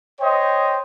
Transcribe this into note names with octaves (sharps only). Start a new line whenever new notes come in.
C5 C#5 D#5 G5